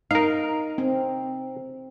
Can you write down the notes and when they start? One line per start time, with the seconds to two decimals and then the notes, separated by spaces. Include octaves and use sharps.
0.11 D#4 A#4 F5
0.78 C4